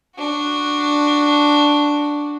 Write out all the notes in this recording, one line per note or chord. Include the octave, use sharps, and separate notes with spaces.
D4 F#4